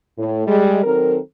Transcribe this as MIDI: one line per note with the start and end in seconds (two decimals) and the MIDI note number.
0.17 0.45 45
0.47 0.80 55
0.47 0.80 56
0.83 1.17 51
0.83 1.17 54
0.83 1.17 60
0.83 1.17 69
0.83 1.17 70